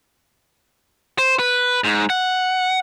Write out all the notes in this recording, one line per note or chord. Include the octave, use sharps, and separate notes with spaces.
C5
B4
G#2
F#5